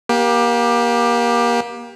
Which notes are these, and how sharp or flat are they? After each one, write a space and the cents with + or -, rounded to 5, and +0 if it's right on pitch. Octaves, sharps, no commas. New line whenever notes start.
A#3 +30 G4 +10